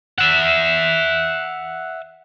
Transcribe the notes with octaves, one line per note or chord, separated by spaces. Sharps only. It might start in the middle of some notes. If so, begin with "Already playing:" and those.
E5 F#5